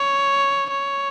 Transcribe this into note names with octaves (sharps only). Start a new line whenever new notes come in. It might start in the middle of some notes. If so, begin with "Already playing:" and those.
Already playing: C#5
C#5